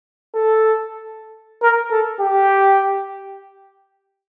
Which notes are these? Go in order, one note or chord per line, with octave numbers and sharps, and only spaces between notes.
A4
A#4
A4
G4